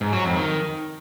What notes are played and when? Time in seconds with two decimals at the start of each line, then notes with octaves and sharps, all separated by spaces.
0.01 G#2
0.13 F#3
0.25 F2
0.36 D#3